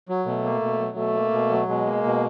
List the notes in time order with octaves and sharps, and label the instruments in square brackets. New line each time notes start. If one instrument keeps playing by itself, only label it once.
[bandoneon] F#3
[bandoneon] B2 [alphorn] A3
[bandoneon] A#3
B2
F#3
[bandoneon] B2 [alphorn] A3
[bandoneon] A#3
B2
F#3
[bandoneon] B2 [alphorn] G#3
[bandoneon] A#3
B2